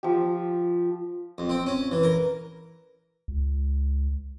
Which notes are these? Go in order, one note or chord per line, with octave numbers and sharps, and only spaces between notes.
F3 G4
F2
C4
C#4
E3
A#4
C#2